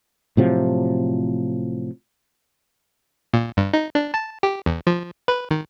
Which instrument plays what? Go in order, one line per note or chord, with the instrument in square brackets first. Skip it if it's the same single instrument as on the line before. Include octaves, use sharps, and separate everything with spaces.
[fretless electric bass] A2 C3 F3 F#3
[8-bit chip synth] A#2
G2
D#4
D4
A5
G4
E2
F3
B4
D#3